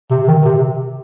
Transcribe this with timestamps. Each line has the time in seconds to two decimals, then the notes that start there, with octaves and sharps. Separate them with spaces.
0.11 C3
0.28 D#3
0.45 C3